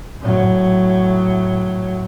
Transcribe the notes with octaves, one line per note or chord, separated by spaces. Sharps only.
A2 F#3